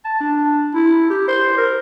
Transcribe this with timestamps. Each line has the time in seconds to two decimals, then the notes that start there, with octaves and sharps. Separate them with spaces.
0.05 A5
0.21 D4
0.75 E4
1.10 G4
1.28 C5
1.57 A#4